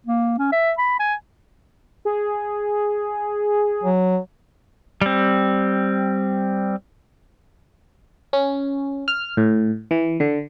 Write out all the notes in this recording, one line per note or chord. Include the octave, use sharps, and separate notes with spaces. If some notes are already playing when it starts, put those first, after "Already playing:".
A#3
C#4
E5
B5
G#5
G#4
F#3
G3 C4
C#4
F6
A2
E3
D3